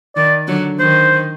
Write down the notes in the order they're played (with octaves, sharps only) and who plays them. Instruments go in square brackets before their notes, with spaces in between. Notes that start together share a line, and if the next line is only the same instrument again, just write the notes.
[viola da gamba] D#3 [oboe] D5
[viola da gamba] D3 F#3
[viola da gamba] D#3 [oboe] C5